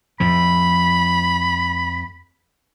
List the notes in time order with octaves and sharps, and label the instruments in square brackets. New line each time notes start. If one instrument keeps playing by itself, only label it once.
[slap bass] F2 A2 F3 [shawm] B5